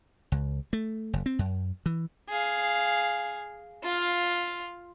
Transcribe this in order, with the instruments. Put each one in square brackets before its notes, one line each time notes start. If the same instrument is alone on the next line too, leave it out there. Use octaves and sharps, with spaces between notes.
[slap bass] C#2
A3
F#1
C4
F#2
E3
[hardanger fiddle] G#4 F5
F4 F5